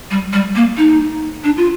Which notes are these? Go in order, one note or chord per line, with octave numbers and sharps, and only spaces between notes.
G3
G3
A#3
D#4
D4
F4